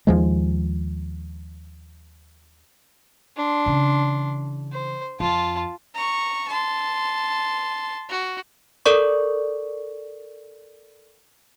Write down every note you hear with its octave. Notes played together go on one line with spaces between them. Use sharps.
D#2 F3 G#3
D4 C6
C#3 E3
C5
F2 F4 A5
A#5 C#6
A5 C6
F#4
A4 A#4 D5 C#6